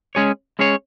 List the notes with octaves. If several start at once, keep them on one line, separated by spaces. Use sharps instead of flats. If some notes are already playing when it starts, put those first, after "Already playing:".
G#3 C#4 G#4 C#5
G#3 C#4 G#4 C#5